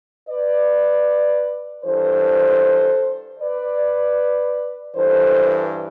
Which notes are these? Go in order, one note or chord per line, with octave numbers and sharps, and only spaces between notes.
B4 D5
G2 E3 A4 C5
B4 D5
G2 E3 A4 C5